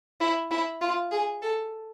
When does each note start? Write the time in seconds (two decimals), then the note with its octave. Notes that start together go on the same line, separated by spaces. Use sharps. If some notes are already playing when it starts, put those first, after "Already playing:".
0.20 E4
0.51 E4
0.81 F4
1.11 G#4
1.42 A4